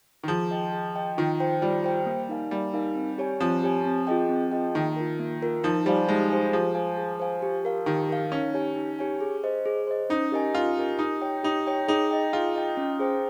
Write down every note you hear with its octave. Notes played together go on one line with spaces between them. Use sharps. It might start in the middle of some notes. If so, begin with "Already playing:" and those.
D#3
F3 G#4
D#5 G5
G#4
D#5 G5
D#3 F4
C5 G5
G3 F4
C5 G5
A#3
D#4 A#4 F5 G#5
G3 A#3
D#4 A#4 F5 G#5
C4
G4 C#5 G#5
F3 C4
G4 C#5 G#5
C4
F4 G#4 D#5 G5
C4
F4 G#4 D#5 G5
D#3 A#3
F4 A#4
A#3
F4 A#4
F3 D#4
G3 G4 C5 F5 G#5
G#3 D#4
G4 C5 F5 G#5
F3 G#4
C5 F5 G#5
G#4
C5 F5 G#5
G4
A#4 F5
D#3 G4
A#4 F5
C#4 D#4
G4 C#5 G#5
D#4
G4 C#5 G#5
G#4
C5 D#5
G#4
C5 D#5
C#4 D#4
G4 A#4 D#5 G#5
C#4 F4
G4 A#4 D#5 G#5
D#4 G4
C#5 G5
D#4 G4
C#5 G5
D#4 G#4
D#5 G5
F4 G#4
D#5 G5
C#4
G#4 C5 G5